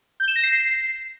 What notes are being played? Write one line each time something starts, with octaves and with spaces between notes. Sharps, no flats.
G6
E7
A#6
C7